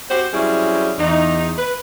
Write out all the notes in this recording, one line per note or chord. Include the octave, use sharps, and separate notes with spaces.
C4 F#4 G4 C5
F#3 G3 C4 C#4 E4 G#4
E2 D#4
B4